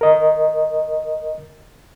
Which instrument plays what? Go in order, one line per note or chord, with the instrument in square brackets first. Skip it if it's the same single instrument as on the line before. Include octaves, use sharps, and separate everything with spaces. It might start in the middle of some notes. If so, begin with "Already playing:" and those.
[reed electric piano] A#4 D#5